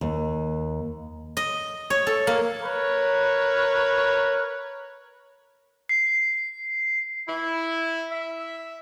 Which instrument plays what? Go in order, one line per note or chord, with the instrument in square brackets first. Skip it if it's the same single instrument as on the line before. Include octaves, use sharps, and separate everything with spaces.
[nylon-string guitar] D#2
[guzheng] D#5
C#5
A4
A#3
[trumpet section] A#4 B4 C#5
[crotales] C7
[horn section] E4
E5